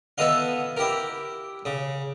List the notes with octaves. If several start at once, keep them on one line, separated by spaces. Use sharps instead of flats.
B3 E4 A4 B4 D#5 F5
E4 G4 A#4
C#3